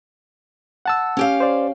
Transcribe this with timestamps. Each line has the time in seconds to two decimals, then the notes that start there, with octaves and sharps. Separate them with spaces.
0.86 F#5 A5 E6
1.17 C#4 G4 F5
1.41 C5 D5